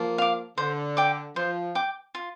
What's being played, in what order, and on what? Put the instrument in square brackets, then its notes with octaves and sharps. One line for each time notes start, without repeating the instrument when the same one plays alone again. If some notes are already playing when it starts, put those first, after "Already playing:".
Already playing: [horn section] F3 A#3
[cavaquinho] F5 D6
[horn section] D3 [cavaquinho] C5
[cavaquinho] G5 D6
[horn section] F3 [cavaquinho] C5
[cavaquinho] G5 D6
F4